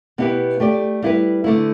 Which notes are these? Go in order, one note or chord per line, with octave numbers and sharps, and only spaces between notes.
B2 B3 E4 G4 B4
A3 G4 D5
G3 E4 B4
D3 A3 E4